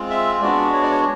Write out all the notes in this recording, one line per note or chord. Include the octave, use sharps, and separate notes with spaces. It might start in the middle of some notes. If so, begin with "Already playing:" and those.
Already playing: G#3 C4 F4
E5
G#3 B3 D4 F#4 D5
C#5
D5
C#5